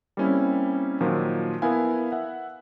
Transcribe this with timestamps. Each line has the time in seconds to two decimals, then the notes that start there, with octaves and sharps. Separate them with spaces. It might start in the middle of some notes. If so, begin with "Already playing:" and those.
0.17 G3 A#3 C4 C#4 E4
1.01 A#2 D#3 F3 F#3
1.62 B3 E4 A#4 F5 G#5
2.12 E5 F#5